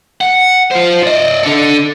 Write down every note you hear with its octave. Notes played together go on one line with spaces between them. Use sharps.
F#5
F4 C5
D5 D#5
D4 A4